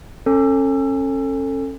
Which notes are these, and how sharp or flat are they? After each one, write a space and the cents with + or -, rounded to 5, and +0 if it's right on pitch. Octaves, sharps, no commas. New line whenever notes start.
C#4 -30 A4 +20